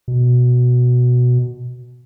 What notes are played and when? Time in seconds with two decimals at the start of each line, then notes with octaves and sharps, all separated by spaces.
0.08 B2